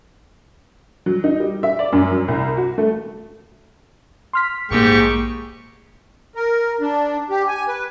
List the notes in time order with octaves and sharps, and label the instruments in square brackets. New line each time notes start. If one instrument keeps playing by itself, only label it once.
[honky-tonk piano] F#3
D#4
G3
E5
D5
F#2
F#3
C2
F#4
A3
[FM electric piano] C6 F6 B6
[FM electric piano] A#1 A#3 [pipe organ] G#2 G4 C#6
[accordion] A#4
D4
G4
G#5
B4